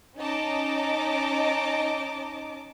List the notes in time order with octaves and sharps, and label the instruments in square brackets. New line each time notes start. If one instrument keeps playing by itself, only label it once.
[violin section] C#4 D#4 D#5 A5 A#5 D6